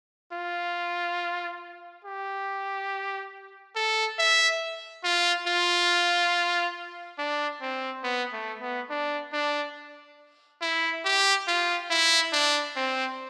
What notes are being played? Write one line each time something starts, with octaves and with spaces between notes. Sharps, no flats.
F4
G4
A4
E5
F4
F4
D4
C4
B3
A3
B3
D4
D4
E4
G4
F4
E4
D4
C4